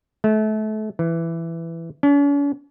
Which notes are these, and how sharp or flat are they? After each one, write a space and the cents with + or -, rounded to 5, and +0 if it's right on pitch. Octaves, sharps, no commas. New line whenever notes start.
A3 -30
E3 +10
C#4 +45